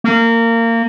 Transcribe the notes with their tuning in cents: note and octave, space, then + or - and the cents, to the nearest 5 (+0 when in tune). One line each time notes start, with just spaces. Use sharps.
A#3 -25